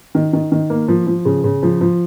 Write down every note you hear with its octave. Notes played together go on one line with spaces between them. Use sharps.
D#3
D#3
D#3
A#3
F3
F3
C#3
C#3
F3
F3